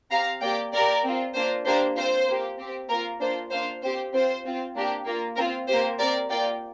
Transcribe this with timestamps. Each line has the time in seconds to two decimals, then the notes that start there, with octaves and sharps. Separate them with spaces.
0.11 C4 G4 F5 A#5
0.42 A#3 G4 D5 G5
0.72 A#3 G4 A#4 D5
1.04 C4 F4
1.35 A#3 D4 F4 C5
1.66 A#3 D4 G4 C5
1.96 C4 F4 C5
2.27 A#3 G4
2.58 C4 G4
2.89 A#3 F4 A#4
3.20 A#3 D4 F4 C5
3.52 A#3 D4 F4 C5 F5
3.82 C4 G4 C5
4.13 C4 F4 C5
4.44 C4 F4
4.76 A#3 D4 G4
5.06 A#3 F4
5.37 C4 F4 A#4
5.68 A#3 G4 C5
5.99 C4 G4 A#4 D5
6.29 A#3 F4 D5 G5